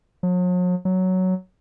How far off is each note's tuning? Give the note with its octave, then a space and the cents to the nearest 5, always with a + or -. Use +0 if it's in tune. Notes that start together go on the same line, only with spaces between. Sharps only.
F#3 -45
F#3 +5